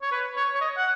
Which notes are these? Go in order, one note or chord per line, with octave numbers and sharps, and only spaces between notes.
C#5
B4
C#5
C#5
D#5
F#5